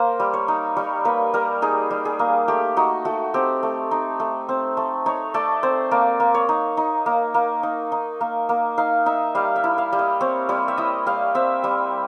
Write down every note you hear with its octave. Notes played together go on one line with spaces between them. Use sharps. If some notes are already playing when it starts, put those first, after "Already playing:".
Already playing: A#3 C5
G3
C#5
D#4
G3 C#5
A#3 B4
G3 A#4
D#4 G#4
G3
G#4
A#3
A3 G4
D#4 F#4
A3 F#4
C4 G4
A3
D#4
A3
C4
A3
D#4 C#5
A3 D5
C4 C5
A#3 D5
A#3
C#5
D#4
D#4
A#3
A#3
D#4
D#4
A#3
A#3
D#4 F5
D#4 E5
G3 F5
E5
E4
F5
G3
D#5
C4 C#5
G3 C#5
E5
E4 D#5
G3 F5
C4 E5
G3 E5